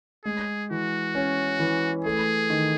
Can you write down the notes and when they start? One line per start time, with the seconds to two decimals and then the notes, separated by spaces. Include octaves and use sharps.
0.24 G#3 G#4
0.70 E3 F#4
1.15 C#4
1.60 E3
2.05 A3 G#4
2.50 D#3